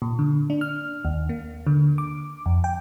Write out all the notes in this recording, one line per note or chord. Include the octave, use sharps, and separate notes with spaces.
A#2
D3
D4
F6
D#2
A#3
D3
D6
F2
G5